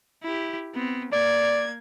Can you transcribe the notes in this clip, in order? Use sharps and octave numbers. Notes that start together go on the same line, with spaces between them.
E4 G4
B3 C4
A#3 D5 G#6